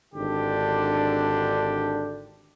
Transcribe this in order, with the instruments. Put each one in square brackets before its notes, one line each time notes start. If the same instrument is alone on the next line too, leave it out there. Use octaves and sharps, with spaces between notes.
[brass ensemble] G#1 D3 D4 G4